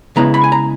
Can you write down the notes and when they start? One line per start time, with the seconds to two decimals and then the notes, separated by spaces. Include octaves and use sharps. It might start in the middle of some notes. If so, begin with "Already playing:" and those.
0.16 C#3 G#3 B3 E4 A#5
0.34 B5
0.44 G#5
0.52 A#5